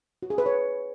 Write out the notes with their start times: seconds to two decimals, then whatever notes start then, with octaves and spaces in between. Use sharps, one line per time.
0.22 F#4
0.30 G#4
0.38 B4
0.46 C#5